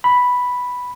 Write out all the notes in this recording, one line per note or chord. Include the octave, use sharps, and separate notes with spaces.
B5